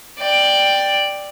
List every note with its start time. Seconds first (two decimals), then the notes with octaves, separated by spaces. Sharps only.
0.19 D5 G5